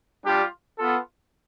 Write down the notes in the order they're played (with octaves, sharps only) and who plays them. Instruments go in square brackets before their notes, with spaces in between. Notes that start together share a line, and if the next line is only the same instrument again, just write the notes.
[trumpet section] G3 D4 F4 G4
B3 F4 A4